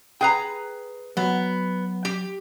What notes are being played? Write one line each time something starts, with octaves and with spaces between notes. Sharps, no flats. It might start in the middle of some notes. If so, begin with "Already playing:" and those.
G#4 B4 G5 A#5
F#3 B3
G4